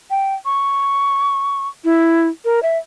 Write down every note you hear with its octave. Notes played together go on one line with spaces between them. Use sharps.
G5
C#6
E4
A#4
E5